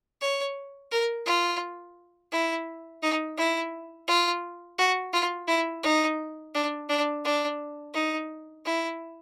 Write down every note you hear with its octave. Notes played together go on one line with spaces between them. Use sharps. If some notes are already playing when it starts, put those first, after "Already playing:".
C#5
A#4
F4
E4
D#4
E4
F4
F#4
F4
E4
D#4
D4
D4
D4
D#4
E4